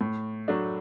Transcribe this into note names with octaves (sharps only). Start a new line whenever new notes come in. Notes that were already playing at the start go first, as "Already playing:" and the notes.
A2
F#3 A3 D4